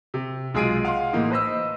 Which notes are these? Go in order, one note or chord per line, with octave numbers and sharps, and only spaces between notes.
C3
B1 G#3 F4 G#4 D7 D#7
F5 F#5 C6
A2 E3 A#3 D#4
B4 C5 D#5 E6